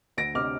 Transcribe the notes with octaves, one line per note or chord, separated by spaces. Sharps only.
D2 A#6 D7
C3 D6 F6